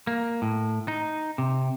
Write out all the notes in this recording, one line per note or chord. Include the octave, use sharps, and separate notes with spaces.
A#3
A2
D#4
C3